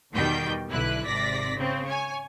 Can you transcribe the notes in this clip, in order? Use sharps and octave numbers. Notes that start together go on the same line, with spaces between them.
E2 B2 D#3 G3 G5 G6
B1 D3 E4 B4 F#6
G#1 C3 D5 A#6 B6
C#3 C4
C#5 G#5